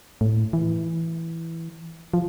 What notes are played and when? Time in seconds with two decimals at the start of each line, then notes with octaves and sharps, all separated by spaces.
0.21 A2
0.53 E3
2.14 F3